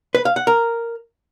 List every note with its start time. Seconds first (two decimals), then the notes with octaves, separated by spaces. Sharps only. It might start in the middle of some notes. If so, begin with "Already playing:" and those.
0.15 B4
0.25 F5
0.36 F#5
0.47 A#4